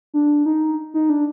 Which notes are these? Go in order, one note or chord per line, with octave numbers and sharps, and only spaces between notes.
D4
D#4
D#4
D4